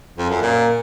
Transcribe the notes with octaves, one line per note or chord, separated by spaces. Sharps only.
F2
F#2
A#2